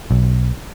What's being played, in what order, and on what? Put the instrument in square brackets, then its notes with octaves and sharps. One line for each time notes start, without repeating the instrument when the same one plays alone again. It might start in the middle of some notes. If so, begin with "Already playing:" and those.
[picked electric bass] B1